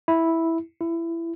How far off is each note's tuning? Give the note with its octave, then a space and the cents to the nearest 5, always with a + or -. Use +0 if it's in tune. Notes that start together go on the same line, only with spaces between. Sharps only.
E4 -5
E4 +20